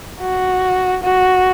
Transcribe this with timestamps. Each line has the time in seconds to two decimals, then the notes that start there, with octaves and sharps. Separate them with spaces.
0.20 F#4
1.03 F#4